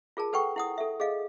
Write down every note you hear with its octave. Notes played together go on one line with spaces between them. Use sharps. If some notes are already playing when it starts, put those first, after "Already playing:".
F4 G#4 A#4 A5
A4 B4 F#5 G5 C#6
E4 F#5 D#6
A4 E5
G#4 D#5 F5